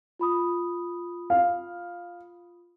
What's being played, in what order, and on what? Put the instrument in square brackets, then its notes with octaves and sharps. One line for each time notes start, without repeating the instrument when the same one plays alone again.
[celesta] F4 B5 D#6
[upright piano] F5